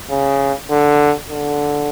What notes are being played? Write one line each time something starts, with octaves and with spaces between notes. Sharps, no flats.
C#3
D3
D3